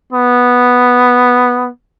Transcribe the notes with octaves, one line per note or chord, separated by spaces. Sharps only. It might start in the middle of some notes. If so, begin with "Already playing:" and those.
B3